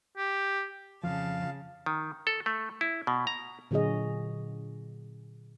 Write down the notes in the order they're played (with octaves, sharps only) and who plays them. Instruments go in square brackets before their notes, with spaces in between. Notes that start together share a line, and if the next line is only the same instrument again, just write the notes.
[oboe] G4
[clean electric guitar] F2 F3 [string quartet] C#3 A5 [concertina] F5
[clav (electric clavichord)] D#3
A4
A3
E4
B2
A#5
[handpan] A#2 D3 F#3 F#4 G#4 D#5